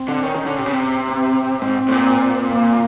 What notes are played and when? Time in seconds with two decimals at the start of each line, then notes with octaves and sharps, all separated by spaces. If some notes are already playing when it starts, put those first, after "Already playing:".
Already playing: C4
0.08 D3
0.23 D#3 C#4
0.35 D#3
0.46 D3
0.58 C3
0.66 C#3 C4
0.74 C3
1.15 C4
1.61 G#2
1.88 A2
1.92 A#2
2.53 A#3